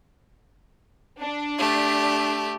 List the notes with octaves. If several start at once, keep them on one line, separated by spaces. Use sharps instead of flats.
D4
A3 G4